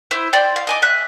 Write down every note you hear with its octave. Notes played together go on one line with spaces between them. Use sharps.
E4 C5
C5 D5 G5
F5
D#5 G#5 D6
E5 F#6